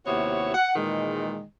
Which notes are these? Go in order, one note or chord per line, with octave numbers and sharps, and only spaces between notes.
D#2 C3 B3 E4 F#4 C#5
F#5
A#2 D#3 E3 G#3